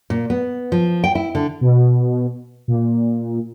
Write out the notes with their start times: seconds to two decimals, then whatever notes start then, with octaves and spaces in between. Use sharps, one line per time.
0.10 A#2
0.30 B3
0.72 F3
1.04 G5
1.15 E4
1.35 D3
1.61 B2
2.68 A#2